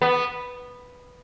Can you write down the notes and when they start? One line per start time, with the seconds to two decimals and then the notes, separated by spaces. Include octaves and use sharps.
0.02 B3